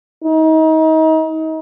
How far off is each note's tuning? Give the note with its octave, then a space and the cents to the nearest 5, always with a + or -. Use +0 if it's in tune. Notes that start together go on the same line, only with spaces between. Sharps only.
D#4 +30